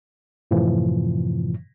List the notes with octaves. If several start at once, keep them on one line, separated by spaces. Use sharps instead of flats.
F#2 A2 C3 E3 F3